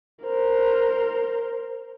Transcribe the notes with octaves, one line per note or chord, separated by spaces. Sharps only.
A#4 C5